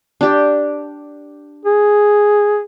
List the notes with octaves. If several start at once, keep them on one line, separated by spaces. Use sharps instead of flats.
D4 G4
G#4